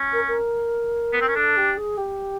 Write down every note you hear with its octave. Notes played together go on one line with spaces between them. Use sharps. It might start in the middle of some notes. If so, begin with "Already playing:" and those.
Already playing: C#4
A#4
A#4
B3
C4
C#4
D4 A4
G4
G#4
G4